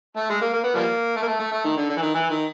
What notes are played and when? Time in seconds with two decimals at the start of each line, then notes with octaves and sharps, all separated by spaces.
0.17 A3
0.30 G#3
0.42 A#3
0.54 A#3
0.64 B3
0.75 F3 G3 A#3
1.16 A3
1.22 A#3
1.27 A3
1.40 A3
1.52 A3
1.64 D#3
1.77 D3
1.90 D3
1.97 E3
2.02 D#3
2.15 E3
2.30 D#3